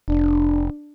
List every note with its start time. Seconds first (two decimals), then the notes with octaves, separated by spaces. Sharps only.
0.08 F1 D4